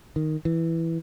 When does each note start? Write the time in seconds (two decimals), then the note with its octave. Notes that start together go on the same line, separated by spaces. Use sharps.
0.16 D#3
0.45 E3